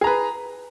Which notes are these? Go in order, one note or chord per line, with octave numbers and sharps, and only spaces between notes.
G#4 B4 A#5